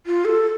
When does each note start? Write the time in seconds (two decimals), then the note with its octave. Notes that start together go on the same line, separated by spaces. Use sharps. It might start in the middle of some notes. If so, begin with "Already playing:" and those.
0.06 F4
0.25 A4